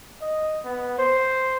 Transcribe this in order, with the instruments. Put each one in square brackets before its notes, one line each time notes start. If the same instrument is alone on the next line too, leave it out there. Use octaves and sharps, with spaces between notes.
[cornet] D#5
B3
C5